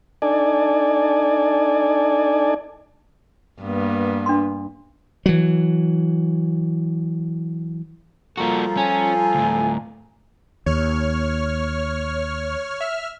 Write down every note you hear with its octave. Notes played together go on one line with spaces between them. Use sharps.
D4 D#4 A4 D5 G#5
G2 A#3 B3
D4 C6
E3 F#3
F3 G3 A#3 F4 F#4 A4 A#5
C#4 G#5
D2 A2
D#2 C#5 F6
E5 F6